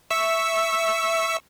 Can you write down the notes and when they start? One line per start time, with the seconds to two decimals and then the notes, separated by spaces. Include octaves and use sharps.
0.10 E5 C#6 E6